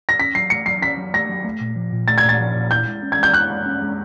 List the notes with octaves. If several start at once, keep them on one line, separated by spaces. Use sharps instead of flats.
A#6
C#4 B6
F#3 C7
A3 C#7
F#3 C7
C#4 B6
F#3
A3 A#6
F#3
A3
A#2
F3
A#2
A3 A6
G#6
A#2 A6
F3
A#2
E4 G6
G#3
C#4
G#6
G#3 G6
E4 F#6
G#3
C#4
G#3